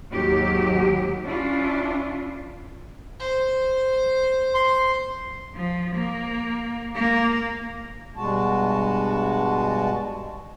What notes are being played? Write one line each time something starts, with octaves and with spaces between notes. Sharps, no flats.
D#2 G#2 D#3 F#3 G4
C#4 D4 E4 F4
C5
C6
F3
A#3
A#3
G2 B2 G#3 F#4 A5